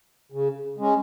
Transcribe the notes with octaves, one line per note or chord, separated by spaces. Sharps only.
C#3
G#3 C#4